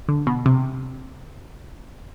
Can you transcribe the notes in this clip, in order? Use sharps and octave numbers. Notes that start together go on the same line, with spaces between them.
D3
B2
C3